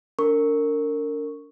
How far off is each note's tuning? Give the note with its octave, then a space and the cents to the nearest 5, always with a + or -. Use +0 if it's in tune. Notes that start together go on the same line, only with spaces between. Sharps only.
D4 -35 A#4 -25 C#6 +0